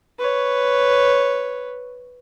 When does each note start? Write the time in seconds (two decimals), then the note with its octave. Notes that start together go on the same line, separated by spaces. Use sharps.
0.19 B4 C#5